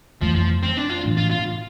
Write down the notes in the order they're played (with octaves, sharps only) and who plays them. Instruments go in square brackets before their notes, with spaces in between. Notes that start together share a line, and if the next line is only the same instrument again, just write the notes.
[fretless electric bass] F2 E3 A3 [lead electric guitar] F3
[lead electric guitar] F3
C4
D4
F4
[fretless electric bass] A2 E3 A3 D4
[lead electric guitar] F4
F4